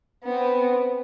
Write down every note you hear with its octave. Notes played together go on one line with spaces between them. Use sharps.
B3 C4